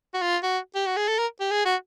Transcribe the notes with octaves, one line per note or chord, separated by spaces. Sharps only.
F#4
F4
F#4
G4
F#4
G#4
A4
A#4
G4
G#4
F#4